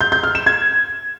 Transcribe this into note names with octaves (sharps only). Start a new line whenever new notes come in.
G6
G6
F6
E7
G#6